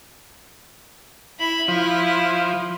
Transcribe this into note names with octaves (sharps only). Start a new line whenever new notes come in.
E4 B5
F3 E4